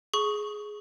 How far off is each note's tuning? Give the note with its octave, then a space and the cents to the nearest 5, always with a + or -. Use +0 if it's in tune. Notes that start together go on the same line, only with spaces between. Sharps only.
G#4 +10 C#6 +0